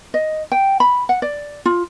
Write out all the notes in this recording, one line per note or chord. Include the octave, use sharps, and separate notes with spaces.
D#5
G5
B5
F#5
D5
F4